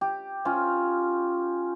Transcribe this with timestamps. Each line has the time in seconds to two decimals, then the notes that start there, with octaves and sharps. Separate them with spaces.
0.01 G4
0.45 C#4 F4